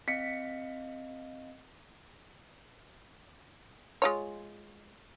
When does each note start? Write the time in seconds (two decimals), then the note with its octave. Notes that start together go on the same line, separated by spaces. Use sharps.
0.08 C4 D#5 F5 B6 C#7
4.02 G#3 F4 C#5